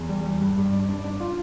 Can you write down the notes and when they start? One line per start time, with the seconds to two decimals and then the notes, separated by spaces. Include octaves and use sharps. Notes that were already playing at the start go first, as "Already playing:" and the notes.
Already playing: E2
0.09 G3
0.25 G3
0.41 G2
0.57 G2
0.73 D4
0.89 D4
1.04 D4
1.20 F4